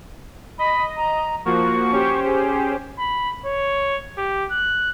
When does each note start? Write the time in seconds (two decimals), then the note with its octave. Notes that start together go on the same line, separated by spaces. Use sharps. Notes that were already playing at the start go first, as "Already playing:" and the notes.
0.59 D#5 B5
0.97 A#5
1.45 F3 A#3 F#4 C#6
1.92 C#4 G4 C5
2.27 G#4
2.99 B5
3.46 C#5
4.17 G4
4.51 F#6